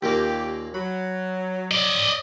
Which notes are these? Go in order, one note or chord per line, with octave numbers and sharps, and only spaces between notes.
D#2 A#2 A#3 G4
F#3 B5
D5 D#5